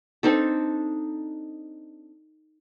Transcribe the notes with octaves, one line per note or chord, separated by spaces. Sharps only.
C4 D4 D#4 A4